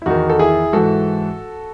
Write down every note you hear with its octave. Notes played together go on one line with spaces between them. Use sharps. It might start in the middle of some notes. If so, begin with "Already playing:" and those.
E4
E2 D#3 D#4 F#4
A4
E4 G#4
G#2 E3 F#4 A4